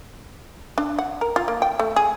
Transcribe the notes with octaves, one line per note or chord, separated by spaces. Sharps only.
D4
F#5
A#4
F4
A#3
G5
A3
G#4